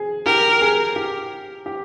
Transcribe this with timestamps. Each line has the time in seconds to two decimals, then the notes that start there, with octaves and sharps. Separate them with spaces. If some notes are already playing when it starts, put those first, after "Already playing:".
Already playing: G#4
0.26 G4 A#4
0.61 G#4
0.96 G4
1.66 G4